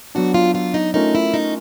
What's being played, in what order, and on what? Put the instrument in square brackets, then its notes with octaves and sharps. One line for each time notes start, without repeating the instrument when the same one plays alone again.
[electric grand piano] F#3 B3 D4 [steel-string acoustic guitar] F#4
[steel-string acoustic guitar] F4
F4
D#4
[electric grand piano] A3 C#4 F4 A#4 [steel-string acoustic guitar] D#4
[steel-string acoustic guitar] E4
D#4